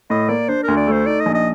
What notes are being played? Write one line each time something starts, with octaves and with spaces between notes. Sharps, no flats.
A2 D#5
A#3 D5
D4 C5
D2 A#4
D5
A3 C5
D#4 D5
D#5
A#1
D#5